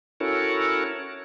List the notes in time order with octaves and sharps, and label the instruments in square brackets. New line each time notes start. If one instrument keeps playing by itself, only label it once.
[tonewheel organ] C#4 E4 F#4 A4 A#4 C#5